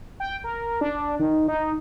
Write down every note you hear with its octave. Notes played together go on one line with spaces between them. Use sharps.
G5
A#4
D4
D#3
D#4